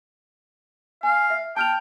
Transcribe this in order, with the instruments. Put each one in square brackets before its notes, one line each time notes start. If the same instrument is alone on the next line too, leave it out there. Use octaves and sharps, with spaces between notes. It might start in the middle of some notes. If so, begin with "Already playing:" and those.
[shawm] F5 [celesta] G#5
[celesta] E5
[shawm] G5 [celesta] A5 F6 F7